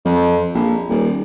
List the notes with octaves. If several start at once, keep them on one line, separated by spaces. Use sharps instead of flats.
F2
A#1
D#1